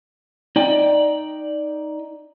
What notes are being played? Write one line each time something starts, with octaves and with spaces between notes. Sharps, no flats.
D#4 D5 G5